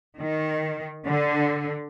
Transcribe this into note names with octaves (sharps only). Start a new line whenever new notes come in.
D#3
D3